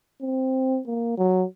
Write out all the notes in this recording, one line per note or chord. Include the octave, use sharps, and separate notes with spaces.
C4
A#3
F#3